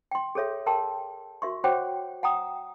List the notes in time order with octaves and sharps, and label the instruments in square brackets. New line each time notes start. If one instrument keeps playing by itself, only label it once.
[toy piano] G5 C6
G#4 A4 C#5 E5
G#4 A#4 G5 A5 C6
F#4 A#4 E5 C6 C#6
F#4 C5 C#5 F#5 G5 D6
F#5 G5 A#5 D#6